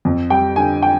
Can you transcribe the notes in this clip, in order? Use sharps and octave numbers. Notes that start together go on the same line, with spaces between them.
F2
G3 G5
D3 G#5
G5